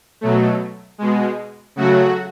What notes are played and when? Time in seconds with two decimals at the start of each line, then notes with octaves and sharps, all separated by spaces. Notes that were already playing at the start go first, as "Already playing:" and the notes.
0.21 B2 F#3 A3
0.98 B2 G#3
1.76 C#3 F#3 A3 F#4